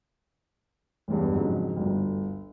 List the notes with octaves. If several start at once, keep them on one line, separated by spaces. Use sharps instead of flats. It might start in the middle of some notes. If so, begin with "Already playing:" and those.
A1 E2 G2
F2 G#2 C#3 F#3
G1 D2